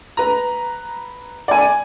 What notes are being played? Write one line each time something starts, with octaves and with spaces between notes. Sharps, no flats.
B4 A#5
D5 G#5